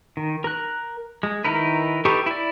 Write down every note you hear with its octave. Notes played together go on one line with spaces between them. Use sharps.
D#3
A#4 F#6
G#3
D#3 D#4 E4 A#4 B4
D#4 G4 A4 B4 C#6
E4 D5